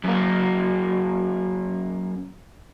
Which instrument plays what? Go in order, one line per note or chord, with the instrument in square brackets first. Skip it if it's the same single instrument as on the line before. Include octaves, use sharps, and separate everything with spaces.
[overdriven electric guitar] F#2 A#3